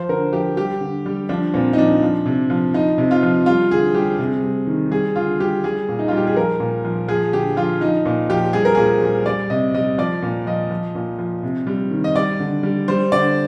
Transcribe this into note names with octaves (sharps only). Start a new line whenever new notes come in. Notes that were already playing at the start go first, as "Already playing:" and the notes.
Already playing: F3 C5
D3 A#4
F3 G4
G3 G4
D3
G3
F3 D4
A#2 C4
D#4
F3 D4
F3
C3
F3
F3 D#4
C3
F4
F3
G3 F4
D3 G#4
G3 G4
C3 G#4
G3
D#3
G3 G#4
D3 F4
G3 G4
G3 G#4
A#2
D#4
G3 F4
G4
G#4
F3 A#4
A#2
F3
F3 G#4
D3 G4
F3 F4
F3 D#4
A#2
F3 G4
G3 G#4
A#4
A#2 G#4
G3
G3 D5
C3 D#5
G3 D#5
F3 D5
A#2
F3 D#5
F3
A#2
F3
C3
G3
D#3
D#5
G3 D5
D3
G3
G3 C5
D3 D5